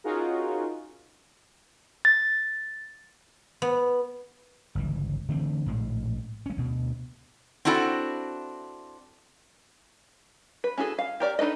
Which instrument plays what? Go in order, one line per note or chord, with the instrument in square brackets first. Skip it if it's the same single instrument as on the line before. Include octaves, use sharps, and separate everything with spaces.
[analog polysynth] C#4 D#4 F4 F#4 G#4 A#4
[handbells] A6
[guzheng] B3
[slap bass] G1 C#2 E3
D3 E3 A3 C4
A#1 A2 G#3
G#3 C#4
D2 B2
[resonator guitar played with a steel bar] C4 D4 E4 F#4 A4
[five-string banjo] B4
C#4 E4 F#4 G#4 A4
F5
G4 A#4 D5
D4 D#4 A4 B4 D#5